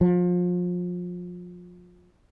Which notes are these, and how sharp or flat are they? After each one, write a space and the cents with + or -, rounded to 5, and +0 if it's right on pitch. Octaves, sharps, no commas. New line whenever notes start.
F3 +30